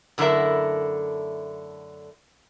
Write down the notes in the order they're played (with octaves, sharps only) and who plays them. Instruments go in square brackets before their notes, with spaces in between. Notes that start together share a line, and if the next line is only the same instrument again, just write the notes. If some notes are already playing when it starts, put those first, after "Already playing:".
[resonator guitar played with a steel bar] F#2 D3 A3 E4 A#4 E5